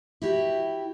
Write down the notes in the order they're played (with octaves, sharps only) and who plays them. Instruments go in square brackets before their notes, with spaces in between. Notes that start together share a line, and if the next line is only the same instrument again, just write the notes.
[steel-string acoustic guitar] E4 F#4 G4